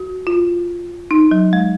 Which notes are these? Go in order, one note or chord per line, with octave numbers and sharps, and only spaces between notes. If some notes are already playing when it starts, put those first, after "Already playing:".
Already playing: F#4
F4
D#4
F#3
G#3